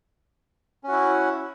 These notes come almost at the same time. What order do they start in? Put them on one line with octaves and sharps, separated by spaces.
C#4 F#4 E4